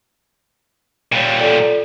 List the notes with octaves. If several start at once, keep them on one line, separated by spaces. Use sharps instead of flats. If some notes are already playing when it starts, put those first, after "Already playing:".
A#2 G3 G#4 C#5
F4 A4 D5